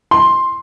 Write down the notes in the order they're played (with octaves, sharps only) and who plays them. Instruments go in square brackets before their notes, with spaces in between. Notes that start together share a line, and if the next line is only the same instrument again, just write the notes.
[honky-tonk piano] C6